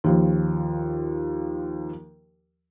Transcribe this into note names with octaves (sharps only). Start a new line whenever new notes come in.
D#2 F3